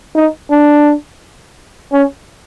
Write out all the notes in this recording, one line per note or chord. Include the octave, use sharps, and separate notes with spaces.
D#4
D4
C#4